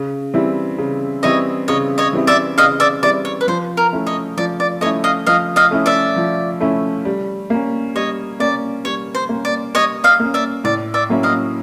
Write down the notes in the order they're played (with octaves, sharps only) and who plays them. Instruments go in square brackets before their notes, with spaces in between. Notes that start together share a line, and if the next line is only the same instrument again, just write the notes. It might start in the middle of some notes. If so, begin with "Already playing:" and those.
Already playing: [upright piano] C#3
E3 G3 C4 E4
C#3
[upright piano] E3 G3 C4 E4 [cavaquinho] C#5 D#5
[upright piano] C#3 [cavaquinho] C#5 D#5
[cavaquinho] C#5 D#5
[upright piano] E3 G3 C4 E4
[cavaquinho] D5 E5
[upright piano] C#3 [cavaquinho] D#5 F5
[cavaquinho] D5 E5
[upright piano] E3 G3 C4 E4 [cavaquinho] D5
[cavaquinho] C#5
B4
[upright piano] F3 [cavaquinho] C5
[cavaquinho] A#4
[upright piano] A3 C#4 E4
[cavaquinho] C#5 D#5
[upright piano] F3 [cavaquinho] D5
[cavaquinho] D5
[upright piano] A3 C#4 E4 [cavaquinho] C#5 D#5
[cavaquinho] D#5 F5
[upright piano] F3 [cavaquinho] D#5 F5
[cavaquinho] D#5 F5
[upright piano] A3 C#4 E4
[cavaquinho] D5 E5
[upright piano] F3
A3 C#4 E4
G3
A#3 C#4
[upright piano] G3 [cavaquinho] C#5 D#5
[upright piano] A#3 C#4 [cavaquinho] D5
[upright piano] G3 [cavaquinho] C#5
[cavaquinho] C5
[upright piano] A#3 C#4
[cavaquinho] D5
[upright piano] G3 [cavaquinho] C#5 D#5
[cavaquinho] D#5 F5
[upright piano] A#3 C#4
[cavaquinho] D5 E5
[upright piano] A2 [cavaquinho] D5
[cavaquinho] D5 E5
[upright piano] F#3 A#3 C#4 E4
[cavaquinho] D#5 F5